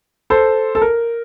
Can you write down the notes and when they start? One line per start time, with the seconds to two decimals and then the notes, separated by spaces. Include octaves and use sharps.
0.30 A4 C5
0.75 A4
0.82 A#4